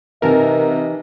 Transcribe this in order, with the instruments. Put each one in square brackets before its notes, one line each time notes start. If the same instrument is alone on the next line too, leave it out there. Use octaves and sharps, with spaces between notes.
[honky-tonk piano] C3 F#4 [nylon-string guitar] E3 D#4 A5 [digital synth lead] A#4 [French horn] D#5